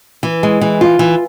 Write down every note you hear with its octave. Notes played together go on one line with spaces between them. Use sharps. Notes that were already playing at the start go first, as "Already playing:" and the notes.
E3
G#3
E3
F4
E3